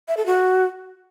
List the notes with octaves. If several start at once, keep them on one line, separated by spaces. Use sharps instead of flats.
E5
A4
F#4